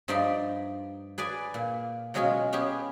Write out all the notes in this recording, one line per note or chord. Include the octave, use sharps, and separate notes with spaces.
G2 F3 D#4 D5 E5 C6
G#4 B4 D5 G#5
A#2
B2 F#3 G#3 C#4 F4
B3 C#4 G4 G#4